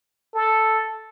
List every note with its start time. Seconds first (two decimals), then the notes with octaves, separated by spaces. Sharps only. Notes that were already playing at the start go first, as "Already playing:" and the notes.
0.34 A4